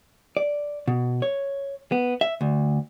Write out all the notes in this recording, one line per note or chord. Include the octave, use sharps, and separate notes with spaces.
D5
B2
C#5
B3
E5
D2